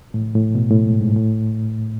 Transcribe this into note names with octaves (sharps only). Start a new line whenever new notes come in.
A2
A2
B2
A2
G#2
G#2
A2